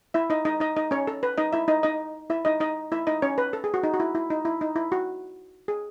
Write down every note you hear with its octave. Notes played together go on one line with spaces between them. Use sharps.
E4 E5
D#4 D#5
D#4 D#5
D#4 D#5
D#4 D#5
C#4 C#5
A4
B4
D#4 D#5
E4 E5
D#4 D#5
D#4 D#5
E4 E5
D#4 D#5
D#4 D#5
E4 E5
D#4 D#5
C#4 C#5
B4
A4
G#4
F#4
D#4
F#4
E4
E4
D#4
E4
D#4
E4
F#4
G#4